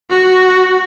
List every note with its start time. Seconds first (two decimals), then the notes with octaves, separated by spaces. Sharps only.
0.10 F#4